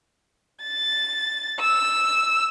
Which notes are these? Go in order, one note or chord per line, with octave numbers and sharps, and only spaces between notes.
A6
E6